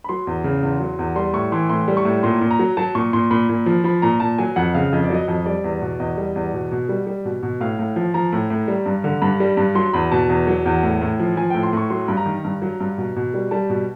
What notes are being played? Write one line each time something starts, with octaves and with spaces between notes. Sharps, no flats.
B5
F#3 C6
E2
C#3
E2
F#3
E2
G3 C6
A2 C#6
E3 C6
A2 C6
G3
C#6
A2
A#2 C6
A#2
A#5
F#3
F#3 A5
A#2 C#6
A#2 C6
A#2 B5
A#2
F3
F3 B5
A#2 A#5
A#2 A5
F#3 G#5
F2 F#5
C#3 F5
F2 D#5
D5
F#3 D#5
F2
G3 D5
E2
B2
E2 D#5
G3
E2
B2
B2
G3
G3
B2
B2
A2 F5
A2
F3
F3 A#5
A2
A2
G3
G2
D3
G2 B5
G3
G2
F#3 C6
E2 B5
B2 A5
E2
F#3
E2
A2
A2
F3
F3 G#5
A2 G5
C6
A2 C#6
F#3 C6
G2 B5
A#5
D#3
G2
F#3
G2
B2
B2
G3
G3 A5
B2